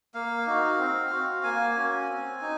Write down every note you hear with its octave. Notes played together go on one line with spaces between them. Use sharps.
A#3 F5
D#4 F#4
C4
F#4
A#3 G#5
C#4 F#4
C4
D#4